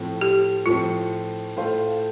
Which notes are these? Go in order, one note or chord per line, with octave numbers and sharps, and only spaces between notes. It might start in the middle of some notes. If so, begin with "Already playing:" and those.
Already playing: A2 F3 C4
G4
A2 F3 C4 F4
A2 A3 F4 C5 F5